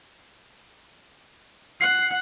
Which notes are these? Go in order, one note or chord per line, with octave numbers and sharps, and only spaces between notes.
F#5 C7